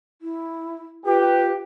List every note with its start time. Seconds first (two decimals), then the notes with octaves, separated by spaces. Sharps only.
0.22 E4
1.06 F4 G4 B4